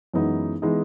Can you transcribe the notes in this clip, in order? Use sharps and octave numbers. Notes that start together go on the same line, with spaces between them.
F#2 E3 G#3 B3 D#4
E3 G#3 B3 D#4